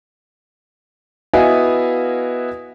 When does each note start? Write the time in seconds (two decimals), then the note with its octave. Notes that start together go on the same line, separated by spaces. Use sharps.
1.34 B3 E4 F#4 D#5 F5 G#5